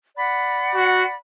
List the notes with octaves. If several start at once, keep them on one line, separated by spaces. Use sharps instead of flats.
D5 F#5 B5
F#4